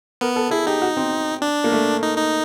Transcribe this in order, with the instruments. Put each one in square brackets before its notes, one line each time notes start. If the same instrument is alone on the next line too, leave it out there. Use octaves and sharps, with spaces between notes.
[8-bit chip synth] B3 [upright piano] A#4
[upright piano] A4
[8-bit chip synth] E4 [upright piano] G#4
[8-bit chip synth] D#4 [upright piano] G4
[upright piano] F#4
C4
[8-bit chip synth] D4
[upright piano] A#3
A3
[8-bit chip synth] D#4
D#4